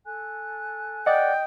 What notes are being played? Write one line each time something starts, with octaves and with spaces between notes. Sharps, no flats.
A4 G#5 F#6
D5 D#5 F#5 G5